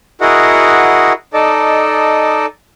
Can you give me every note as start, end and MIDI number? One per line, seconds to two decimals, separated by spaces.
0.21 1.13 64
0.21 1.13 66
0.21 1.13 68
0.21 1.13 70
0.21 1.13 75
0.21 1.13 78
1.34 2.46 63
1.34 2.46 69
1.34 2.46 74
1.34 2.46 75
1.34 2.46 81